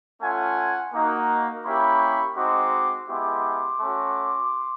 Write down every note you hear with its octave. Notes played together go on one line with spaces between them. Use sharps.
A3 C#4 F4 F#5 G#5
A#3 D#4 F#4
A#3 C#4 E4 G4 B5 C#6
G#3 C4 D#4 F#4 C6 D6
G#3 B3 E4 G4 C6 D6
A3 C#4 F#4